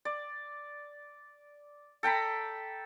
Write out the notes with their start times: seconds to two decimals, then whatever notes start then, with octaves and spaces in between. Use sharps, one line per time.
0.05 D5
2.03 A4 G5 A#5 B5